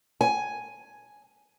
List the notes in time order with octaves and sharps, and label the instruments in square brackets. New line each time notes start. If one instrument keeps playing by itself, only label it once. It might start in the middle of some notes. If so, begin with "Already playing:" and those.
[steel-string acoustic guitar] G#5